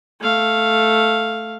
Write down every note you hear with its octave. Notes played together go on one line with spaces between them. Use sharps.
A3 F5